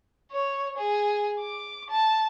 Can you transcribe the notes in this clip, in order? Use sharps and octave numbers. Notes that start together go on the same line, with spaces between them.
C#5
G#4
D6
A5